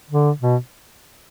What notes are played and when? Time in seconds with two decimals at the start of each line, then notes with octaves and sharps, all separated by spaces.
0.10 D3
0.41 B2